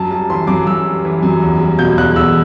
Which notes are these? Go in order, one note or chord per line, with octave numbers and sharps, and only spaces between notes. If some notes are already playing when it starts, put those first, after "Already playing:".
Already playing: F#2 A5
G3 A5
E3 C6
F#2 D6
F#2 E6
G3
E3
F#2
E2
G3
B2 G6
E2 F#6
E2 E6